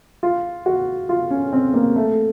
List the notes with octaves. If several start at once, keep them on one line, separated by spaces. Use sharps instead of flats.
F4
F#4
F4
C#4
C4
A#3
A3